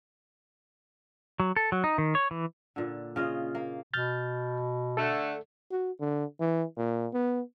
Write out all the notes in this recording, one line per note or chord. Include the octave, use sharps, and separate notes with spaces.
F#3
A4
F#3
D#4
D#3
C#5
E3
A#2 D3
C#3 F4 D#5
A#3
B2 F6 G6 A6
D3 A3 A4
F#4
D3
E3
A#2
B3